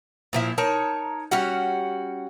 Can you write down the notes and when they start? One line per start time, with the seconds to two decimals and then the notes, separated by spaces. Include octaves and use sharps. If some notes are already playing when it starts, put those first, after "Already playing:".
0.33 A#2 F3 E4
0.58 D#4 A#4 C#5 A5
1.31 G3 C#4 F#4 F#5